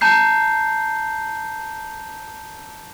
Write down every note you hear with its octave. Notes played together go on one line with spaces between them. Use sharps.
A5 A#5 G6 C7